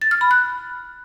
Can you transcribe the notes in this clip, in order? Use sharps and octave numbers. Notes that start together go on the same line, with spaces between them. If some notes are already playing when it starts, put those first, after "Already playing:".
A6
F6
B5
F#6